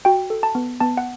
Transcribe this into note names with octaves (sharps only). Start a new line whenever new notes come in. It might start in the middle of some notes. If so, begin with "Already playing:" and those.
F#4 G5
A4
A5
B3
B3 A5
F#5